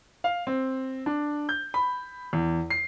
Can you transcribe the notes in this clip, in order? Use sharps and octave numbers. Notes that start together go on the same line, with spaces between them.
F5
C4
D4
G6
B5
E2
C7